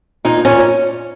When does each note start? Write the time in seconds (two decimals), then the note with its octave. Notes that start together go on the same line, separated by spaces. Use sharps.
0.25 A#2 D#4
0.45 A#2 C#4